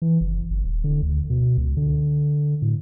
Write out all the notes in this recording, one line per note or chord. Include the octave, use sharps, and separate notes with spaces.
E3
F#1
G1
D#1
D3
D2
B2
C#2
D3
A2